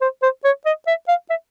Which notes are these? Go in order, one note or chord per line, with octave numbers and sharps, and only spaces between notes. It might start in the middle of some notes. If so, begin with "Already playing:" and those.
C5
C5
C#5
D#5
E5
F5
E5